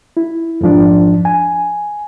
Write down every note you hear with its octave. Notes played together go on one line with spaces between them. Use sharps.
E4
F2 G#2 F3 D4
G#5